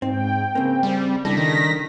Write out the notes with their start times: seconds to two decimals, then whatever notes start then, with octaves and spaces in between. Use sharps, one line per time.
0.02 G#2 C4 G5
0.55 C#3 A#3 C4
0.83 G3 C4
1.25 C#3 G3 D4 E4 A4 A#6 B6
1.37 D#3